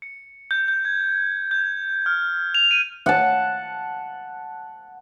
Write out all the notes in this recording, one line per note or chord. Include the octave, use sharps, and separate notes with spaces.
C#7
G6
G6
G#6
G6
F6
F7
D#7
F#5 A5